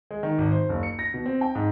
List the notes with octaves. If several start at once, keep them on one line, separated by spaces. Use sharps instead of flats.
G#3
D#3
G#1
C5
F#1
C#7
A#6
B2
C4
G5
G#2